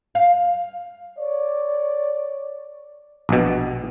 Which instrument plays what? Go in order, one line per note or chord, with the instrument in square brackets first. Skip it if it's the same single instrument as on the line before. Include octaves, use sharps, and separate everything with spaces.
[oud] F5
[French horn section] C#5 D5
[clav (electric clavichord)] A#1 B2